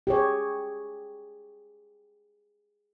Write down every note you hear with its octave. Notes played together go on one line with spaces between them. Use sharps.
G4 G#4 C#5